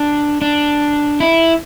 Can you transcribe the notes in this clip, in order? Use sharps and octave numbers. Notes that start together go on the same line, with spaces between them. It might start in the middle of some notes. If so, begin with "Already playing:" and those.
Already playing: D4
D4
E4